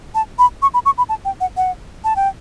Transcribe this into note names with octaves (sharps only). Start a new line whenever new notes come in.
A5
B5
C#6
B5
C#6
B5
A5
G5
F#5
F#5
A5
G5